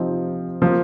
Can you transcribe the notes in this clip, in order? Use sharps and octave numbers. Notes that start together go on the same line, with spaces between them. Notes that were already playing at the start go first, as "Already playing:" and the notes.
Already playing: C3 F3 C4 D#4
F3 A#3